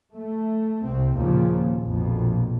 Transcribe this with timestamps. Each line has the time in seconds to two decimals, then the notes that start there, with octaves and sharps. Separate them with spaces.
0.13 A3
0.83 C2 C4
1.14 D#2 A#2 C#3 F3
1.82 A#1 F2 B2